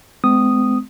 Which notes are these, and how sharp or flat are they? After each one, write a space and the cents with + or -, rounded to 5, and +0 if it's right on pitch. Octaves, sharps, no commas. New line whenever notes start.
G#3 +30 C4 -40 D#6 -5